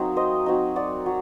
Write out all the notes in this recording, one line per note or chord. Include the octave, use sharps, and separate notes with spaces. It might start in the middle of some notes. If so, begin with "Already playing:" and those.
Already playing: F#3 A#3 C4 D#4
C5 D#5
F#3 C4 D#4
D5 F#5
F#3